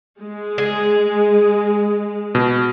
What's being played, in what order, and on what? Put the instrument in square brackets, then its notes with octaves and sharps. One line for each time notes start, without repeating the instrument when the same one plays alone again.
[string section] G#3
[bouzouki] G#4
[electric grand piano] B2